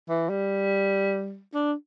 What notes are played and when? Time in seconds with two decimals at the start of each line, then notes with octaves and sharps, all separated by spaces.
0.09 E3
0.30 G3
1.54 D4